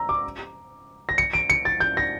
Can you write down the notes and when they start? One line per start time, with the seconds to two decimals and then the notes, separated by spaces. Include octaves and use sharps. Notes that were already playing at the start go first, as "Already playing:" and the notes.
Already playing: A#5 E6
0.09 D6
1.09 A#6
1.18 C#7
1.33 D7
1.50 C#7
1.65 A6
1.80 G6
1.97 A#6